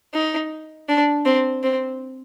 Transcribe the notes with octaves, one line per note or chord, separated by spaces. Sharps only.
D#4
D4
C4
C4